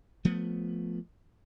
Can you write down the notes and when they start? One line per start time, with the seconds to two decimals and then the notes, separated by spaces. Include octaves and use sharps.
0.25 F3 A3 B3